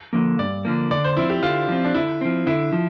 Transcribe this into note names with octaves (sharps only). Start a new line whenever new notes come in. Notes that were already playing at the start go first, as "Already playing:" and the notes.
D3 F3 A#3
G2 D5
D3 F3 A#3
D3 D5
C5
F3 C4 E4
G4
D3 F4
F3 C4
D4
D3 E4
F3 C4
D3 E4
F3